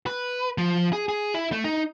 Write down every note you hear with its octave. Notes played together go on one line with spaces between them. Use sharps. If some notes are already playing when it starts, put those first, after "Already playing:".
B4
F3
G#4
G#4
E4
A3
D#4